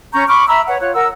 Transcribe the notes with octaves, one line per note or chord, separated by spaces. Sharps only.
C#4 A#5 C#6 G6
B5 C#6 D6 F6
E5 A#5 B5 E6
B4 C#5 F#5
F4 C#5 F#6
A#4 F#5 E6